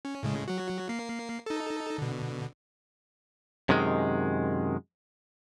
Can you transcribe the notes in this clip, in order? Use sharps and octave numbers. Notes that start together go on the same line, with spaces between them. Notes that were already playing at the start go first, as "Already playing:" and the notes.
C#4
A2 C#3 G#3
F#3 F#4
A#3 C7
D#4 A4
B2 D3
F#2 C3 D#3 G#3